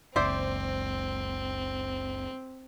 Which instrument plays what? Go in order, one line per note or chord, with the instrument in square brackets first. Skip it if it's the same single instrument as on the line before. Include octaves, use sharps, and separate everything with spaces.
[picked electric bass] F#1 C#2 [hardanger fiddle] C4 [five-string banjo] C5 D5 E5